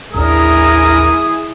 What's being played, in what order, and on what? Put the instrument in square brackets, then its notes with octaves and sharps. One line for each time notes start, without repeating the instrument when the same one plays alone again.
[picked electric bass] A1 D#2 D4 [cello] E4 G#4 [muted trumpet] A#4 [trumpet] D#6